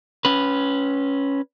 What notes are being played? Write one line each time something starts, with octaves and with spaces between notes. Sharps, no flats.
C#4 B4